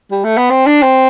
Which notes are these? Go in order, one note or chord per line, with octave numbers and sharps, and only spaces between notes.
G3
A3
B3
C4
D4
C4